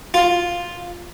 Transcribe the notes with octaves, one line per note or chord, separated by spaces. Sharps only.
F4